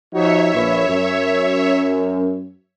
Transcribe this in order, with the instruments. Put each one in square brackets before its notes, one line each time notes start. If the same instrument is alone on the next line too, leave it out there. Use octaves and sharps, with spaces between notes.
[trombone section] F3 D#4 F#4 [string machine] C#5 E5
[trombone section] A#1 A#2 B4
F#2